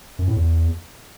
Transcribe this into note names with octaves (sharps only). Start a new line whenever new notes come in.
F#2
A2
E2